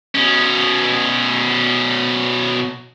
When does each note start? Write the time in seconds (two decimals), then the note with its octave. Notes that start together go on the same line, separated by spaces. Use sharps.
0.15 B2 C#4